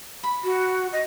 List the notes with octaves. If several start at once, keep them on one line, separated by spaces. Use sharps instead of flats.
B5
F#4
D#5